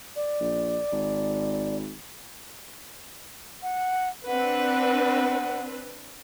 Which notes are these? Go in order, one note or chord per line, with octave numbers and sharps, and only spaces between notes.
D5
A#1
G#1
F#5
C4 D4 B4 F#5